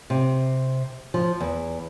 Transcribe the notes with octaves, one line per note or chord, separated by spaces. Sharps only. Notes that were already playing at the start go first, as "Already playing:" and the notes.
C3
F3
E2